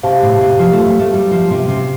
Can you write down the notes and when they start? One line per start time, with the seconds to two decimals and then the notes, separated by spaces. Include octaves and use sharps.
0.03 C3 G4 C5 F5 A5
0.22 A2
0.41 C3
0.59 F3
0.73 A3
0.86 A3
1.00 A3
1.14 G3
1.31 F3
1.51 C3
1.68 C3